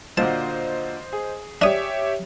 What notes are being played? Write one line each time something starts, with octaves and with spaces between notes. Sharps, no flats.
A#2 D3 F#4 C5 D#5 A5
G#4
D4 G4 C#5 E5 D#6